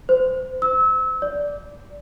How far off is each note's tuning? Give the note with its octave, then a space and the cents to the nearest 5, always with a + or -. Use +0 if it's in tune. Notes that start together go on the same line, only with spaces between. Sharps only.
C5 -25
E6 -30
D5 -10